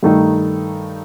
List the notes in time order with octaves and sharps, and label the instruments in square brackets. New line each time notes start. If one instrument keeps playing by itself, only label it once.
[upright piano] G2 D#3 A3 D#4